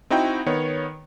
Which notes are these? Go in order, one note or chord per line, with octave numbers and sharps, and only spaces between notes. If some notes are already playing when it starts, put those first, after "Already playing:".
C4 D#4 E4 F#4 G5
D#3 B3 C#5